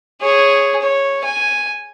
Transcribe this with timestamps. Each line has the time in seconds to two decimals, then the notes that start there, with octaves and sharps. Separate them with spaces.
0.21 G#4 C#5
0.82 C#5
1.24 G#5